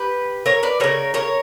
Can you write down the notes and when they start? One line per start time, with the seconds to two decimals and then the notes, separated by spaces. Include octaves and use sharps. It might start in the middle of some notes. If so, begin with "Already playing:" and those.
Already playing: G4 B4
0.46 A#4 C#5
0.63 B4 D5
0.80 C#3 G3 A#4 C#5
1.14 A#4 C#5